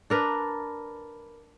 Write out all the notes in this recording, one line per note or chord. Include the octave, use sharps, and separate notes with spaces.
D4 A#4 B4